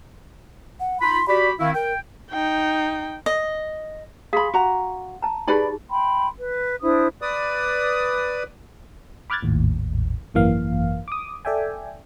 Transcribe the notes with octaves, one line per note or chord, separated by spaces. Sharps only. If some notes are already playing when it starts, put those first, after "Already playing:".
F#5
D#4 F4 B5 C6
F#4 G4 D5 B5
D#3 C4 E4 F5
A#4 G5
D#4 G5
D#5
G#4 F5 B5 C6 D6
F#4 A#5
A5 A#5
D#4 G4 G#4 B4 D5 B5
G5 B5 C6
B4
D4 E4 C5 D#6
B4 D5 D#6
B5 D6 F6 F#6 G#6 A6
G#1 D#2 A2
G#1 F#2 E3 A#3 F5
D6 D#6
A4 D5 E5 G5 G#5